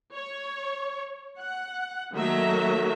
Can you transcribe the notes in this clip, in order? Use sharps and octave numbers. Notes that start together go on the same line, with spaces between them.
C#5
F#5
D#3 F#3 A3 A#3 E5 A#5